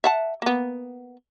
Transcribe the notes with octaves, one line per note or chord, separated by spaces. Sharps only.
E5 F#5 A5
A#3 B3